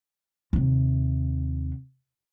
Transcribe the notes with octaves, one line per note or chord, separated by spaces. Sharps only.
D#2 C3